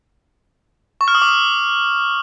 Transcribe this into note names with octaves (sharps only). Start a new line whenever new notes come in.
C#6
F6
D#6
D6
D#6